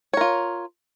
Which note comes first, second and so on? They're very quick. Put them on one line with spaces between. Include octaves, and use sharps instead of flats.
C#5 A#4 F4